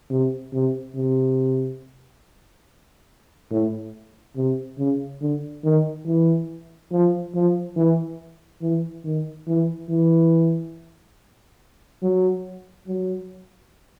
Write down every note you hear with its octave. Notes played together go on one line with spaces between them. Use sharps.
C3
C3
C3
A2
C3
C#3
D3
D#3
E3
F3
F3
E3
E3
D#3
E3
E3
F#3
F#3